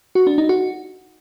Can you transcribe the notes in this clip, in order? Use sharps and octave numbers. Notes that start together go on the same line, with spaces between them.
F#4
D4
D#4
F#4